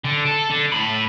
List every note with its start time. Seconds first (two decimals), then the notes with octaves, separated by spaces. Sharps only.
0.04 D3
0.26 A4
0.50 D3
0.72 A2 B5